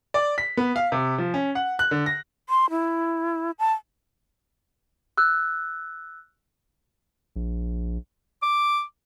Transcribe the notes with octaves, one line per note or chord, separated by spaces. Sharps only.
D5
B6
B3
F5
C3
F3
C#4
F#5
F#6
D3
A#6
C6
E4
A5
E6 F#6
A#1
D6